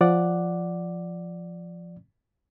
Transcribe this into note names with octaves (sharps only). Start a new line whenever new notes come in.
F3 D5 F#5